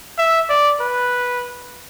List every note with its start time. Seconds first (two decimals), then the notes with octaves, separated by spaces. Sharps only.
0.18 E5
0.49 D5
0.80 B4